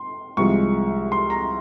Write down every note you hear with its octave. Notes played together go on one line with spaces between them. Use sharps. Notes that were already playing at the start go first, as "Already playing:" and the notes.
Already playing: C6
C2 C3 F3 G#3 C#6
C6
A#5